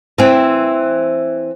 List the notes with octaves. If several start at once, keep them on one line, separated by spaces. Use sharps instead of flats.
E3 C4